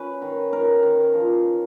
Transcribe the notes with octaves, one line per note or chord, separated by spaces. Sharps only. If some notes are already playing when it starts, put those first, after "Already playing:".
Already playing: C#4 B4
D#3
D#3 A#4
D#3
F3